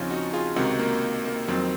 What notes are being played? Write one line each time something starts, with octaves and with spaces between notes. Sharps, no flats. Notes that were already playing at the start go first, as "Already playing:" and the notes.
Already playing: D#2 C#3 F3 C4 C#4 D#4 F4
D#4 F#4
F4 G#4
C#2 C3 D#3 D#4 F#4
A#3
A#3
F2 D#3 F#3 C4